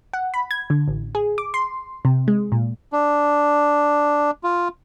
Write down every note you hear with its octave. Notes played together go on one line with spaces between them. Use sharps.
F#5
B5
G#6
D3
A1
G#4
D6
C6
C3
G#3
A#2
D4
F4